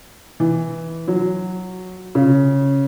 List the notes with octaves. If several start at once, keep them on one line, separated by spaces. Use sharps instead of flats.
E3
F#3
C#3